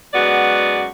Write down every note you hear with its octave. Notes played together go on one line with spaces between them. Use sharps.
F#2 G#3 B3 F#4 D5